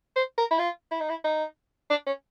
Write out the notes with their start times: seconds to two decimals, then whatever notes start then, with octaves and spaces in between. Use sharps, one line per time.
0.16 C5
0.37 A#4
0.51 E4
0.59 F4
0.91 E4
1.00 D#4
1.10 E4
1.24 D#4
1.90 D4
2.06 C#4